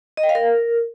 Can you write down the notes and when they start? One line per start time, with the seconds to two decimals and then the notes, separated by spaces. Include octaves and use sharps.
0.17 D#5
0.23 G5
0.29 F5
0.35 A#4